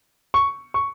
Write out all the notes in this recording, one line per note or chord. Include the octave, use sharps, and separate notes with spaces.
C#6
C#6